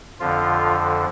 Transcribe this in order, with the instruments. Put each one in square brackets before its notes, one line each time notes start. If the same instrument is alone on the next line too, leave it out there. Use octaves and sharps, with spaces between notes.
[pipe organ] F2 D3 F3 F4